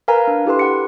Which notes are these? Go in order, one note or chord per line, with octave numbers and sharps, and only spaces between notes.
A#4 B4 F5 G#5 A#5
D4
E4 G4 A4 B4 C6
F#5 C#7